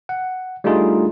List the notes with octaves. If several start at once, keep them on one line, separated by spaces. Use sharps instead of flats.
F#5
G3 A3 D4 D#4 F4 G#4